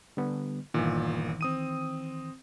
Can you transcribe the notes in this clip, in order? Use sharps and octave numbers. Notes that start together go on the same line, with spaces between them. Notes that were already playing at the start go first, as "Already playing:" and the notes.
D3 G3 B3
G1 A#2 D#3 E3
C4 D#6 D#7